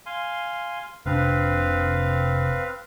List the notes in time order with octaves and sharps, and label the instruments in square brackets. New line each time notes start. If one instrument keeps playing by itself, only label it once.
[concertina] F5 G#5 C6
[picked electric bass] F1 C3 D4 [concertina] C4 B4 F5